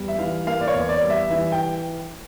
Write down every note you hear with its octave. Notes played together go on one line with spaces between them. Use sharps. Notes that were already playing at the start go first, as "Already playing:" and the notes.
Already playing: E2 G3
E5
E3 F5
A#3 F5
D5
C#5
E2
D5
G3
E5
E3 E5
G5